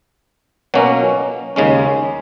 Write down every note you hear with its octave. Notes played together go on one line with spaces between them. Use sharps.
B2 F#3 A#3 C#4
D#2 C#3 G#3 C#4